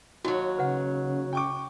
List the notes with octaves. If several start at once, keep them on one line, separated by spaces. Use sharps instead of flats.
D#2 F#3 D#4 F#4
C#3 B4 F#5
G5 C#6 D6